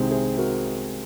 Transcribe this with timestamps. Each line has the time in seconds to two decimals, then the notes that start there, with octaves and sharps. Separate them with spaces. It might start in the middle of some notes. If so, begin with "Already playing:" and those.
Already playing: C2 C3 D#3 G#3 C4 G#4 C5
0.11 G#4 C5
0.37 F#4 A#4